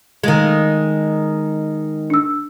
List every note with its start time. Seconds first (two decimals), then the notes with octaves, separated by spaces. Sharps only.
0.24 D#3 G#3
2.10 D4 E6